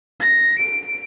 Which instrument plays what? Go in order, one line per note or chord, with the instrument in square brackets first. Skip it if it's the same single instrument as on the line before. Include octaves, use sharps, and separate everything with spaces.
[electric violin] A#6
D7